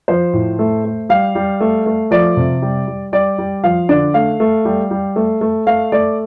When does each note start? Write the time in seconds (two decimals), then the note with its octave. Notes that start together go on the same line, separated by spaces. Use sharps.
0.08 F3 C5
0.33 A2
0.59 A3
0.84 A3
1.09 G3 F5
1.35 G3
1.61 A3
1.86 A3
2.11 F3 D5
2.37 C3
2.62 G3
2.87 G3
3.13 G3 D5
3.38 G3
3.64 F3 F5
3.89 D3 D5
4.14 A3 F5
4.40 A3
4.65 G3
4.91 G3
5.16 A3
5.41 A3
5.66 A3 F5
5.92 A3 D5